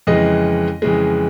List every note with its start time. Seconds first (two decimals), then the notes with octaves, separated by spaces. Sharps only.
0.07 F2 C#3 E3 G#3 D#5
0.82 F2 C#3 E3 G#3